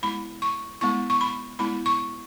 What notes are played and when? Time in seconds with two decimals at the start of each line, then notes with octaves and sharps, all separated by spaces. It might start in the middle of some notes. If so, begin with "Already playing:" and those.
0.03 G#3 B3 E4 B5
0.42 C#6
0.81 G#3 B3 E4 C#6
1.10 C#6
1.21 B5
1.59 G#3 B3 E4 B5
1.86 C#6